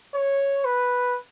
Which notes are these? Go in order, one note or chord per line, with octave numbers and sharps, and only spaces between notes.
C#5
B4